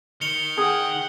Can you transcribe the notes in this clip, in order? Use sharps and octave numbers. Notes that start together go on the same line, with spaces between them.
D#3 C#7 F7 G7
G#4 F#5 G5